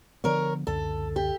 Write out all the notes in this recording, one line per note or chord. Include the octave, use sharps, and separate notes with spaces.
D3 F3 B3 A#4 C#5
C#2 F#2 D3 A4
G4